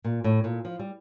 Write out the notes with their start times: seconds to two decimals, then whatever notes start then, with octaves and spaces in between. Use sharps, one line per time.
0.04 A#2
0.24 A2
0.44 A#2
0.65 F3
0.79 G3